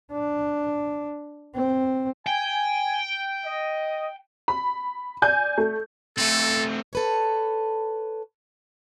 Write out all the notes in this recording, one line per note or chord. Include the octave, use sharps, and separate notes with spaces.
D4
C4
G5 G#5
D#5
B5
D5 G#5 G6
A3
A3 C4 A4
A4 B4 C#5